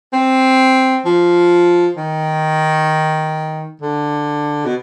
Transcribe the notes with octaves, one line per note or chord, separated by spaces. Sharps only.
C4
F3
D#3
D3
B2